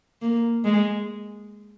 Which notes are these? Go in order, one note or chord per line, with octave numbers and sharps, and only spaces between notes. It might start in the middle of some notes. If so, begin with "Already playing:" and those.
A#3
G#3